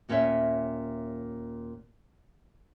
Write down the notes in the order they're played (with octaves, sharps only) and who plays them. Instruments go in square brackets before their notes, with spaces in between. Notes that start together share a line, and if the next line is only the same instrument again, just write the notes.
[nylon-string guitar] D#2 A#2 C#4 C#5 E5